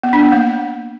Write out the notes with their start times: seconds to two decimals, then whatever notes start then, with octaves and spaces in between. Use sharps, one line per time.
0.03 B3
0.13 D4
0.23 B3
0.32 A#3